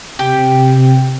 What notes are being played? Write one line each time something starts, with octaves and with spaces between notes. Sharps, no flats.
C3 G4